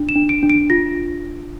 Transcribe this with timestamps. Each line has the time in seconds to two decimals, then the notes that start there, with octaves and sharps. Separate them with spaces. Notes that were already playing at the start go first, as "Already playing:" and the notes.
Already playing: D4
0.09 E7
0.16 D4
0.29 D7
0.42 D4
0.50 D7
0.70 F4 A#6